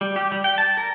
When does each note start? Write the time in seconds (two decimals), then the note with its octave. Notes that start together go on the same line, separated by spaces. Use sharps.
0.01 G3
0.16 G4
0.32 G3
0.44 G5
0.58 A5
0.77 A#4